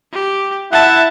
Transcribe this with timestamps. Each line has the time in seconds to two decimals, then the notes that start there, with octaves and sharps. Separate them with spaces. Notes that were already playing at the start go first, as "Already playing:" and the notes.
0.13 G4
0.73 E4 E5 F#5 A5